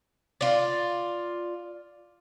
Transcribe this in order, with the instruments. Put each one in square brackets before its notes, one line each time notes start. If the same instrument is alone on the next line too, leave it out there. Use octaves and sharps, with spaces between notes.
[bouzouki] F4 D5